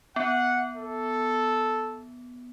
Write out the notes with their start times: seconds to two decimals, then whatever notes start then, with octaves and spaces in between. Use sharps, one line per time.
0.16 B3 F#5
0.76 A4